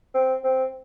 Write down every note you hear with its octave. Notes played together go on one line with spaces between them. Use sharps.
C4
C4